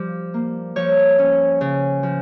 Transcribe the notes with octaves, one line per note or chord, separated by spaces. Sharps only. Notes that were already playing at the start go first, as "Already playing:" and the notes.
Already playing: F3 G3
A#3
F3 C#5
C#4
C#3
F3